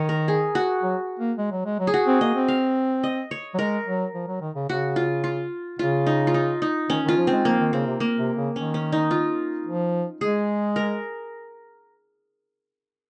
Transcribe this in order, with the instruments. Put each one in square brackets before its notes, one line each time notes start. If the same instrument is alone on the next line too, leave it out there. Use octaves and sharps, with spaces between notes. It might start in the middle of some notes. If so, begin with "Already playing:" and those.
Already playing: [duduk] D#3 [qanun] C#5 D#5
[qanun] A#4
G#4
F#4
[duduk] F#3
A#3
G#3
F#3
G#3
F#3
[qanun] G#4
F#4
[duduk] C4
[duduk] A#3 [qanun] D#5
[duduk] C4
[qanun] F5
D#5
C#5
[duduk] F#3
[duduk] G#3 [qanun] A#4
[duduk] F#3
F3
F#3
D#3
C#3
[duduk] C#3 [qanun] F#4
[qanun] F4
F4
[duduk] C#3 [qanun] F4
[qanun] D#4
F4
D#4
D#4
[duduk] D#3 [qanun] C#4
[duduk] D#3 [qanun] F4
[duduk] F3
[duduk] G#3 [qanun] C4
[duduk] F3 [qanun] A#3
[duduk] D#3
[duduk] C#3 [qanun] C4
[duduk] C3
[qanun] A#3
[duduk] C3
C#3
[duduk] D#3 [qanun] C#4
[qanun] C#4
D#4
F4
[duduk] F3
[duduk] G#3 [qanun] G#4
[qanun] A#4